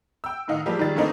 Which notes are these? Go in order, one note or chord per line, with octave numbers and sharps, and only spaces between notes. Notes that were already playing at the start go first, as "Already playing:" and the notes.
G5 E6
A2 D#3 D#4 F5 F#5
F3 G3 G#3 A#3 G4
D#3 G3 G#4 A6
D3 E3 A3 A#3 C4 D#4